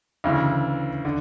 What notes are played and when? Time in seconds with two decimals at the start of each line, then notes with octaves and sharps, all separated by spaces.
0.24 D2 C#3 E3
1.05 D3